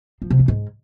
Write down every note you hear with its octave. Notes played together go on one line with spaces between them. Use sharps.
F3
C3
E3
G#2